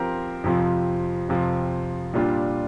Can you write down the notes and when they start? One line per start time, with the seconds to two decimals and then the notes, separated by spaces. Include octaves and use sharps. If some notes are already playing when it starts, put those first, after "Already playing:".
Already playing: F3 C4 G4 A#4
0.44 F2 C3 F3
1.29 F2 C3 F3
2.14 A#2 G3 D4 F4